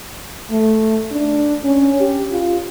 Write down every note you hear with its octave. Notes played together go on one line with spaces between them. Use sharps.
A3
D4
C#4
G4
F4